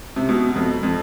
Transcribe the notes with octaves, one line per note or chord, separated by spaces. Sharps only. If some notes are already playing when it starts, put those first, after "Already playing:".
C3
B2
F2
F2